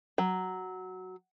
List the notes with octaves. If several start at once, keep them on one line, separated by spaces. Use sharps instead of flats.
F#3